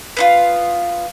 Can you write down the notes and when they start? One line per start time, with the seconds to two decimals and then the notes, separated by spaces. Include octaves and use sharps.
0.17 B3 D#4 F4